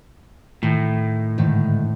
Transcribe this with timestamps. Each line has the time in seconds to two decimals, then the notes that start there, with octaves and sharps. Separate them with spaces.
0.63 A2 D#3
1.38 G#2 D3 D#3